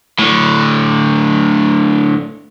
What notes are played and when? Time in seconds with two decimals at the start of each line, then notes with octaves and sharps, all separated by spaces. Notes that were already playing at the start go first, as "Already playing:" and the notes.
0.19 A2 D3